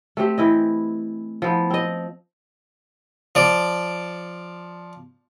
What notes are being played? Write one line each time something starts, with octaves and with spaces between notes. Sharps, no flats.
A3 C4 G4 C5
E3 E4 D#5
F3 B3 E4
C4 D#5
F3 D5